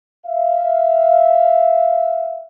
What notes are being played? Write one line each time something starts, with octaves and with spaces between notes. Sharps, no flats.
E5 F5